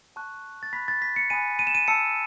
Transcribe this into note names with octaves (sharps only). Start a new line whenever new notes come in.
A5 C#6 F#6
A6
B5 F#6 B6
A6
B6
C#7
G#5 B5 D#6 F#6 D#7
D#7
E7
D#7
A5 E6 C#7